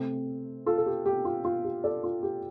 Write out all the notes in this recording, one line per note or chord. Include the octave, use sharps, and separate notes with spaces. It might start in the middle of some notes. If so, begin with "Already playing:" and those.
Already playing: C3 A3 C4
F4 A4
A4
G4
G4
F4
F4
G4
A4 D5
F4
G4